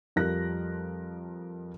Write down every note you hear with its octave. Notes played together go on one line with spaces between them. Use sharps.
F2 F3 G3 A#4 F#6 A#6